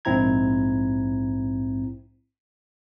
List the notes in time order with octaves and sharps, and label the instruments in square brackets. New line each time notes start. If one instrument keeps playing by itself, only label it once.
[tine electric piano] A#1 G#2 C4 E4 A#5 G#6